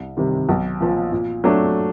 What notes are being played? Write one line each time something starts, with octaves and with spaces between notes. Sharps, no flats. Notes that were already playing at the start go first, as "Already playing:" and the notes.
Already playing: C2
C3 D#3 G3
B1
A#2 F3
A#2
F#3 A3 D4